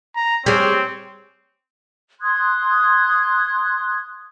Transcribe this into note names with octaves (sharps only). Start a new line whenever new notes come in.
A#5
G3 C4 G#4 C#5
C6 D#6 F#6 G#6